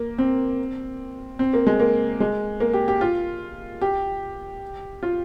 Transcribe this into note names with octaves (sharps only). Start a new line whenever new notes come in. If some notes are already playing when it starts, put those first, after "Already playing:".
Already playing: A#3
C4
C4
A#3
G#3
A#3
G#3
A#3
G4
G4
F4
G4
F4